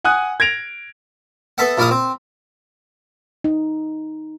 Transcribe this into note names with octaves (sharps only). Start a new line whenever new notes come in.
F#5 G#5 D#6 F#6
G#6 A#6 D7 F7
B3 A4 E5 F#5
A#1 D4 E4 F5 D#6
C4
D#4